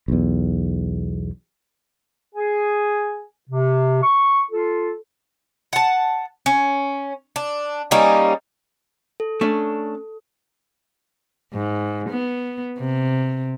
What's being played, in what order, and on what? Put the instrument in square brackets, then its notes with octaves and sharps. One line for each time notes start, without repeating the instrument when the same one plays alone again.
[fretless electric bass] B1 E2
[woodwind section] G#4 G#5
C3
C#6
F4 A4
[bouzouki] F#5 A5
C#4
D4
G3 A#3 C#4 D#4
[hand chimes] A4
[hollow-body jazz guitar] A3 C#4 D4
[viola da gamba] G#2
B3
C3